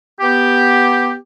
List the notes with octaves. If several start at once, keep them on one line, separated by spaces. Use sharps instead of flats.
B3 G4